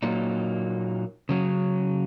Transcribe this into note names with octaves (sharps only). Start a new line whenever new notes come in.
A#2 F#3 A#3 D#4
C#3 F#3 C#4